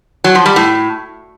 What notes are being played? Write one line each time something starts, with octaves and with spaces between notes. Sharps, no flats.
F#3
F3
G3
A2